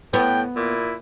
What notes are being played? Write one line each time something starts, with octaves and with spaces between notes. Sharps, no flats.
A2 B3 G5
A#2 E4